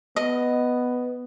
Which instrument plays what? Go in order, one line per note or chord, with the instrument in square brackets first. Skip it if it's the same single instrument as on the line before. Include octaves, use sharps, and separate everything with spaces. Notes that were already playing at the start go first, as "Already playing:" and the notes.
[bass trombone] B3 [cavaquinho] D#5